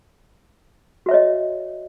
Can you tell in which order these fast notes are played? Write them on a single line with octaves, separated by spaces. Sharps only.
F#4 E5 C#5 D#5